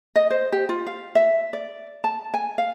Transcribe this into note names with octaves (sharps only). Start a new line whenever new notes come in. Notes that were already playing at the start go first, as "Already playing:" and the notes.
D#5
C5
G4
F4
F5
E5
D5
A5
G#5
F5